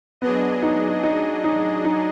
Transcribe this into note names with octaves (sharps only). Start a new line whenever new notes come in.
F#3 B3 D4 G#4 D#5
D#4
D#4
D#4
D#4